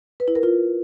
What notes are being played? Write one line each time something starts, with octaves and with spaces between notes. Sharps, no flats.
B4
E4
A#4
F4